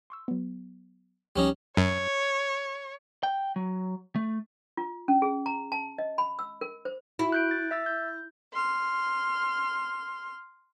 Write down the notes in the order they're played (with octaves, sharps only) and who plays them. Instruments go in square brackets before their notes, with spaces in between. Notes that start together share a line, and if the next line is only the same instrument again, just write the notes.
[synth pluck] C6 C#6 E6
F#3 B3
[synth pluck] C#2 F3 C#5 [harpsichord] G3 C#4 D#4
[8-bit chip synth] F#2 [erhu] C#5
[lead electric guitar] G5
F#3
A3
[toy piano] F4
C#4
G#4
A#5
A5
D#5
B5
E6
A#4
C5
[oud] E4 [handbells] F#4
[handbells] F#6 G6 D7
A6
E5 E6 A6
G6
[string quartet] C6 F6